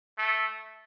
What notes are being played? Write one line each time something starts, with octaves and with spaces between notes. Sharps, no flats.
A3